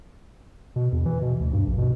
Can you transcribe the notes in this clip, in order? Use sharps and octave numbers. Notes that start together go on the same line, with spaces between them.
B2
E2
E3
B2
D2
G2
A#1
B2